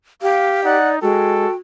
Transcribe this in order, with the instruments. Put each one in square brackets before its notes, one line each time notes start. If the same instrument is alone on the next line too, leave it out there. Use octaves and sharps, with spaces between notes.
[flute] G4 [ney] F5
[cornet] D#4 [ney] D5 [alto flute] F#5
[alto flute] G#3 [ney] F#4 [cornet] A4 [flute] G5